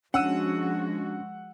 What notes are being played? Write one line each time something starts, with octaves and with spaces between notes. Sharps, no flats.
F3 G#3 C#4 D4 F#4 F#5 E6 D#7